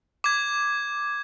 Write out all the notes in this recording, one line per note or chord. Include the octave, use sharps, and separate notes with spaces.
D6 G#6